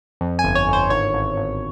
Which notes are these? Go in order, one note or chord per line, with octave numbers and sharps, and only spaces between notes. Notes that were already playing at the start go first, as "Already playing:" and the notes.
F2
G#5
G1
C#5
G1
C5
G#1 C#5
G#1
G#1